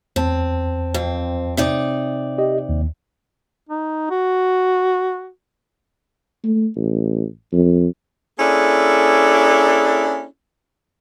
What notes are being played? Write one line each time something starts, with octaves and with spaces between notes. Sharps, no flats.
E2 C4 A5
F2 C4
C3 D#4 D5
G4 D#5
D#2
D#4
F#4
A3
A1
F2
A#3 C#4 D4 E4 G#4 A4